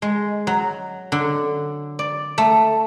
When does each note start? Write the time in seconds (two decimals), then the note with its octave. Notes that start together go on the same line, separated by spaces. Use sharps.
0.02 G#3
0.47 F#3
1.12 D3
1.99 D5
2.38 A3